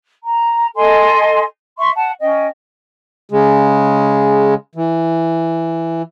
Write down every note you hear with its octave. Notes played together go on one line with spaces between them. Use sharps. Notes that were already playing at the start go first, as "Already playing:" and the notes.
A#5
A4 D#5 G#5 C6
E5 C6 C#6
F#5 A5
C#4 D#5 G5
C#3 G#3
E3